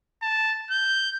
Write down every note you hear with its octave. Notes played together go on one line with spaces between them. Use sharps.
A5
G6